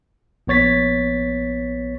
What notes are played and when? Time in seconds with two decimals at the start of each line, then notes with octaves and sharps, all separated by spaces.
0.47 A#1 B3 C#5 A6 B6